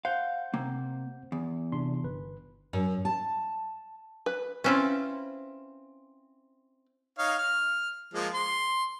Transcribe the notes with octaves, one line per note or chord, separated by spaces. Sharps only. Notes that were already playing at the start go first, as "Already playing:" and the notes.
C5 F5 F#5 G6
C3 A#3
E2
C3 D4 C6
G1 B4
F#2
A5
B4
C4 C#4 E4 F4 B4
D#4 C#5 F5
F6
F3 G#3 A#3
C6